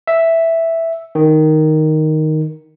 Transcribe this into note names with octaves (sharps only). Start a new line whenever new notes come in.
E5
D#3